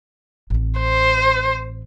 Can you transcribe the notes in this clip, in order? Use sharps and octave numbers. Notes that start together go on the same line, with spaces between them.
A1 C4
C5